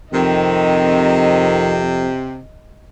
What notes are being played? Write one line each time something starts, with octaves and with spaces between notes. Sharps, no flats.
F2 C3 D#3 D#5